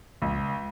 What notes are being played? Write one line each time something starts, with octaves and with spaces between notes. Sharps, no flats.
C#2